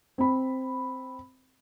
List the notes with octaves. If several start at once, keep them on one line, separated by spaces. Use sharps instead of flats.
C4 B5